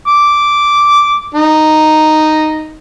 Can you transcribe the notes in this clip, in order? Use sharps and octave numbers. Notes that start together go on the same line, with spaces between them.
D6
D#4